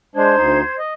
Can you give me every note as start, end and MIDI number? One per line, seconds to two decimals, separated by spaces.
0.16 0.35 56
0.16 0.35 62
0.16 0.75 72
0.16 0.75 92
0.36 0.62 38
0.36 0.62 63
0.79 0.94 75